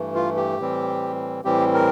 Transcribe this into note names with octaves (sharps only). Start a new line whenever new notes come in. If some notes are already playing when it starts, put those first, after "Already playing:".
Already playing: G2 E3 A3
F4
G4
A2 E3 G3 C4
A2 E3 G3 C4 G4
A#4